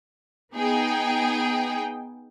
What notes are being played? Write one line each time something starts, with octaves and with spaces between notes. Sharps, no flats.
B3 D#4 G#4 G5